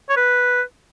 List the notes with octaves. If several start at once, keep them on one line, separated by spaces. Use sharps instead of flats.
C#5
B4